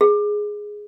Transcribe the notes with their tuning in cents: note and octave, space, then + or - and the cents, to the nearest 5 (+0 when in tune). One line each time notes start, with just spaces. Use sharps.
G#4 +0